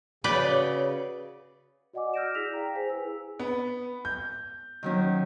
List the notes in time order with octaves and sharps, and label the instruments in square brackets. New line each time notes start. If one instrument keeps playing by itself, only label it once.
[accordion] C#3 [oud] F#4 C#5 [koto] B4 D5 G5
[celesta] F#4 D5 D#5 F#5 G#5 D6
E6 F6 G6 A#6 D7 E7
E4 G#4 D5 A#6 B6 F7
F5 G5 A#5
G#4 C5 G#5 B6
E4 G#4 B4 G#5 E6
[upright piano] B3
G6
[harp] D#3 F#3 C#4